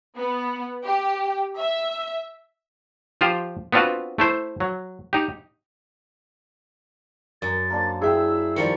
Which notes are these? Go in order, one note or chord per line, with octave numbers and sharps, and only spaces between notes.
B3
G4
E5
F3 F4 G4 C5
B3 C4 D4 F4 F#4 B4
A3 E4 C5
F#3
D#4 G4
F#2 A6
A#3 D4 C5
E4 G#4 E5 G5 E6
D#3 F3 G3 C#5 C#7